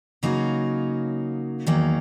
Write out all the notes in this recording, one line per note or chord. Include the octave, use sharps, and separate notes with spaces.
C#3 F#3 A#3 D#4 F#4
E2 D#3 F#3 A#3